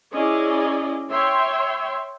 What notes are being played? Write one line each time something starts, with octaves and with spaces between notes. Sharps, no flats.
C#4 E4 G#4 D5 D#5
C#5 E5 G5 C6